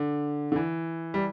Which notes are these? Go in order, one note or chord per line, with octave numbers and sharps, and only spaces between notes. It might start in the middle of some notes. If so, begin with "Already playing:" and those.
Already playing: D3
D3
E3
G3